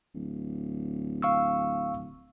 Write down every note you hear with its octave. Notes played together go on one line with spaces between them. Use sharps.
D1
F5 C#6 E6